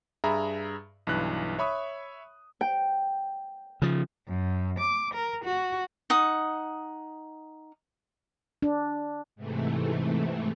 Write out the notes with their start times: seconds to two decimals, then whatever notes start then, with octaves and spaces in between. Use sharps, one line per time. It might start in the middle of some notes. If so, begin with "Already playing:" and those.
0.24 G2 G#4 E5 A#5 B5
1.07 B1 G2 E3 F#6
1.58 C#5 E5 B5 C#6 D#6
2.61 G5
3.82 C#3 F3
4.28 F#2
4.80 D6
5.14 A#4
5.45 F#4
6.10 D#4 F#5 D#6
8.62 D4
9.36 G#2 C3 E3 A3